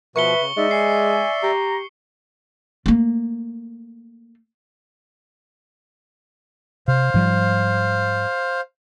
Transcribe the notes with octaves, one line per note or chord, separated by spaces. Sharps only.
B2 F3 B4 E5 C#6 C#7 G7
C#3
G#3 D#4 D5 E5
G#5 C7
G4 A#5
A3 A#3
C3 C5 F5
G#2 F3 G3